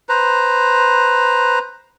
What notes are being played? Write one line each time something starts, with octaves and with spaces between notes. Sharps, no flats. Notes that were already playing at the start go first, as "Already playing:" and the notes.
B4 C5 A#5